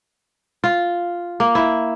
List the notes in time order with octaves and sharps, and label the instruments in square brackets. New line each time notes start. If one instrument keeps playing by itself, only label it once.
[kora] F4
A#3
E4